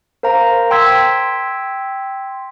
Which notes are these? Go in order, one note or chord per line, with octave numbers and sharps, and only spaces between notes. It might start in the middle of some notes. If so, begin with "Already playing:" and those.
A#4 C5 F5 A#5
G5 C6 E6 G#6 B6